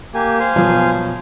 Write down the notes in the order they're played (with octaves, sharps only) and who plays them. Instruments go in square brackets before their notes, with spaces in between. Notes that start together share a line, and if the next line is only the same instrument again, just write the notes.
[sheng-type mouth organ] A#3 G4 G#5
C5 F5 G#5
[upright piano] B2 F3 F#3